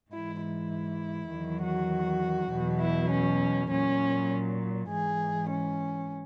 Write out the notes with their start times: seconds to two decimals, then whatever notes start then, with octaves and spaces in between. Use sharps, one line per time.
0.11 G#2 E3 E4
0.41 E4
1.30 E2 D#3 F#3
1.61 F#4
2.51 E2 B2 F#3
2.81 E4
3.10 C#4
3.70 A#2 F#3 C#4
4.89 G#2 E3 G#4
5.49 C#4